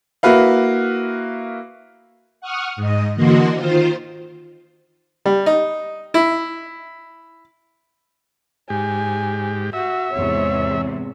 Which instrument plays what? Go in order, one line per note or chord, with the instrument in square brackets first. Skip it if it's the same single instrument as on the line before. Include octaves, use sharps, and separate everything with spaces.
[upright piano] A#3 E4 F#4 B4 F5
[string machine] F#5 C#6 D#6 F6
G#2 D#5
D3 E3 A#3 F#4 D#5 C6
D#3 F4 C5
[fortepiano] G3
D#4
E4
[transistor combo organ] G#2 G4 [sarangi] G#5
[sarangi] F#4 [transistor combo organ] E5
[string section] E2 G#2 C3 [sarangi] C#5